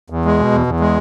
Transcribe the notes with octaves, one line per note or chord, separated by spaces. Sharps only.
E2
G#3
B2
E2
E2
G#3